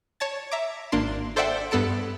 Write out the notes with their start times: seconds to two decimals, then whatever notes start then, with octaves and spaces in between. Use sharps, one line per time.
0.20 C#5 A5 A6
0.51 E5 A#5 D6
0.92 G#1 A#3 D4 C6
1.36 A4 C5 D5 E5 F#5 G5
1.71 G2 B3 A4 A5 D7